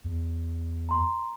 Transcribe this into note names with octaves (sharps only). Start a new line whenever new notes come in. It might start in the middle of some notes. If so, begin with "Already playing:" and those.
E2
A#5 C6